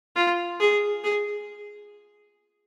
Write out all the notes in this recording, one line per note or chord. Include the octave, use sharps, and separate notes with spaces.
F4
G#4
G#4